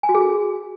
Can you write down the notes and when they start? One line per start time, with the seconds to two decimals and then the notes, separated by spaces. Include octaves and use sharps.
0.03 G#5
0.09 F#4
0.15 G#4
0.20 F#4